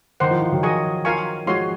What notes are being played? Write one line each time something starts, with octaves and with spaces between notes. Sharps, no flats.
D#3 C5 F#5 C6
F3
F3
D#3 F#3
G#4 D#5 G#5 C#6
F4 A#4 F5 G#5 C#6
F3 G#3 F#4 C#5 F5 C6